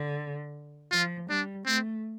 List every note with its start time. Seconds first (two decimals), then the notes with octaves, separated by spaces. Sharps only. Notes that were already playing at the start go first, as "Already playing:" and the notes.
Already playing: D3
0.91 F3 F4
1.29 G3 D4
1.66 A3 C4